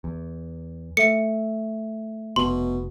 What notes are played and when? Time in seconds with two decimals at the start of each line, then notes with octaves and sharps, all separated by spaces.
0.04 E2
0.97 A3 A4 E5 C#7
2.36 F1 B2 C6